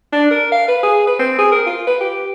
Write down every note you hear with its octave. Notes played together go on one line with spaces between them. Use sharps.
D4
A#4
F5
B4
G#4
B4
C4
G#4
A#4
F4
B4
G4